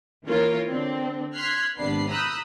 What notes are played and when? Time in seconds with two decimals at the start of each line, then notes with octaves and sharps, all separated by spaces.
0.25 E3 A#3 C#4 F4 A#4 C#5
0.69 D3 C4 D4
1.35 C6 F6 F#6 G#6 B6 C7
1.78 G#1 C3 B3 D4 B5 C7
2.09 A#5 B5 D#6 E6 F#6 G6